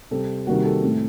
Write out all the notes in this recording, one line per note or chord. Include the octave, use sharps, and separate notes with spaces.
C3 G3 C4 A4
C3 D#3 G3 A#3 F#4
A4
A2 A3 C4